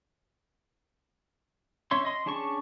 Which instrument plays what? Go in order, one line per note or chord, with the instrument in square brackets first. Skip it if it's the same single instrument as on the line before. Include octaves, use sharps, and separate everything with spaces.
[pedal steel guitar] C#4 C#5 E5 C6
D#5 C6
C#4 D4 G#4 A5 C#6